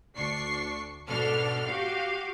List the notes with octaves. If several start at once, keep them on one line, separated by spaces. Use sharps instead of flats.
D2 D4 C#6 C7
G#2 B2 D4 A4 F6
F#4 G4 F5